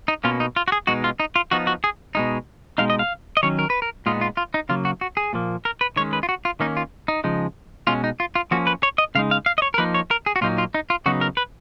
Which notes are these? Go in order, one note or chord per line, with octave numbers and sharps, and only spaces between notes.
D#4
B2 A#3 C#4 F4
D#4
F4
F#4
G#4
B2 G#3 D#4 F#4
F4
D#4
F4
F3 B3 D#4 F#4
F#4
G#4
B2 G#3 D#4
B2 G#3 D#4 F5
D#5
F5
D#5
D#3 F#3 C#4 C#5
A#4
B4
A#4
A#2 G#3 B3 D#4 F4
F4
F4
D#4
C#3 F#3 A#3 F4
F#4
F#4
G#4
A#2 F3 A#3
A#4
B4
D#3 G#3 C#4 C#5
B4
F4
F#4
F4
D#3 A#3 C#4 D#4
F4
D#4
C#3 F3 G#3 D#4
B2 G#3 C#4 F4
D#4
F4
F4
F3 A#3 C#4 F#4
B4
C#5
D#5
C#3 G#3 D#4 F5
F5
F5
D#5
C#5
A#4
F3 A#3 D#4 B4
C#5
A#4
G#4
F#4
A#2 F#3 A#3 D#4 F4
F4
D#4
F4
C#3 F#3 B3 D#4 F#4
A#4
B4